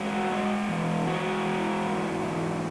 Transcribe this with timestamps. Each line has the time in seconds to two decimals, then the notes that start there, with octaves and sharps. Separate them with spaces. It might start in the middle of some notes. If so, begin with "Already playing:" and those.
Already playing: G#2 G#3 F#4
0.31 G#3
0.69 E3
1.07 G#3 F#4
1.45 E3
1.84 G#2
2.23 E3